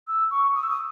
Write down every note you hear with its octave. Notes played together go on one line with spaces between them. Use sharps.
E6
C#6
D#6
E6
D#6